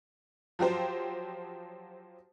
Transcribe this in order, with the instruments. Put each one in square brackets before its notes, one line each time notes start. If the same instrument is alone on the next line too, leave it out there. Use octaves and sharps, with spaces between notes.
[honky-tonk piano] F3 F#3 G4 C5